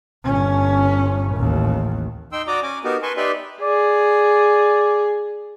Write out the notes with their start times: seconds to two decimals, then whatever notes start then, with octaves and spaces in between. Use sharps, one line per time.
0.24 G1 C#4
1.35 A1 D#2
2.32 D#4 G5 C6 E6
2.47 F#4 D5 A#5 D6 D#6
2.63 C#4 G#5 D6
2.84 B3 D#4 F#4 G4 A#4
3.03 B4 G#5 A5 C6 C#6
3.17 D#4 G4 B4 D5 E5 C6
3.62 G#4 D5